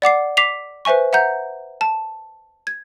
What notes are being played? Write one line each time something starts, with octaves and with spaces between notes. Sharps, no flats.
D5 F#5 D6 C7
D6 B6 C7 F7
B4 C5 E5 G#5 C#6
E5 F#5 A#5 G6
A5
G#6